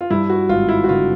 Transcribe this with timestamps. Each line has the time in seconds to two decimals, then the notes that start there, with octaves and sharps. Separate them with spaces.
0.01 F4
0.10 G2 E4
0.29 F#4
0.49 G#1 F4
0.69 E4
0.84 F#4
0.89 D3 F4